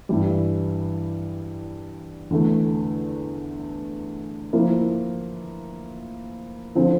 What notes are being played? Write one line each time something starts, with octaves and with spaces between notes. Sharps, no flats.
G2 E3 G3
E2 D3 A3
F3 A#3 E4
D3 F3 C4